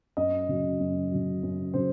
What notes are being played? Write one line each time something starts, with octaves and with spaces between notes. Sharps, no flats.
F#2 D#5
C#3 F#3
F#2
C#3 F#3
F#2
C#3 F#3 C5